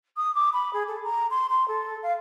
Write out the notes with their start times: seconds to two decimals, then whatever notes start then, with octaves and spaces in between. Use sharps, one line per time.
0.17 D#6
0.35 D6
0.53 B5
0.73 G#4
0.88 A4
1.04 A#5
1.31 C6
1.50 C6
1.68 A4
2.03 F5